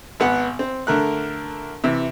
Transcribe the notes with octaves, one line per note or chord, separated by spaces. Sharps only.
G#1 B3 F#5
C4
D3 A3 A#4 F#6
C3 E3